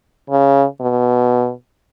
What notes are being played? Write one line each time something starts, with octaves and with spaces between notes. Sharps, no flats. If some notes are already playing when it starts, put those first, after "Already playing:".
C#3
B2